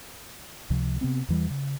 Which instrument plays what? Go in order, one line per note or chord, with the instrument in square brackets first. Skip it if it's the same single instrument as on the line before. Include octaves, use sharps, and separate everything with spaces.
[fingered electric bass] C#2 C3 F3
C3 B3 C4
E2 E3 G3
C#3